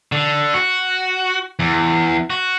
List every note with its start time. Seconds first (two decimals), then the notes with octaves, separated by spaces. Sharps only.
0.12 D3
0.54 F#4
1.59 E2
2.30 F#4